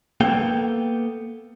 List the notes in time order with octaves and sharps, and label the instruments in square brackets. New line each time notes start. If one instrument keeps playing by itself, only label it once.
[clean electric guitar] A#3 B3 A4 G5